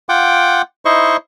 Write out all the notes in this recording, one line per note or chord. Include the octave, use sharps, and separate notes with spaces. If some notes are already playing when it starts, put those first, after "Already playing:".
F4 F#5 G5 D6
D#4 E4 C5 D#5 C#6